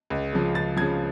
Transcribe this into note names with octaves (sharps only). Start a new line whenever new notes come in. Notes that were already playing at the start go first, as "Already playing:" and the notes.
C#2
C#3 F3
C#2 A6
C#3 F3 G#6